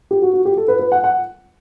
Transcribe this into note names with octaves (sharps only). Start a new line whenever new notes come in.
G4
F#4
F#4
G4
A4
B4
B4
F#5
F#5